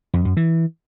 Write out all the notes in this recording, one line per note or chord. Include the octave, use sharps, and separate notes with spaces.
F2
F#2
E3